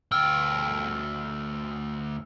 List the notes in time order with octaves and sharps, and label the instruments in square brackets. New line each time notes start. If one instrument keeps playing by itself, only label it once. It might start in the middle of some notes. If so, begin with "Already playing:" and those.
[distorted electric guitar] D2 G5 [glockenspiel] E6 F6